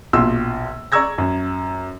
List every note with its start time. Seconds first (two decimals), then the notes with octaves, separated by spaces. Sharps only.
0.13 A#1 B2 F4 E6
0.92 D5 A#5 C#6 E6 G#6 A#6
1.18 F#2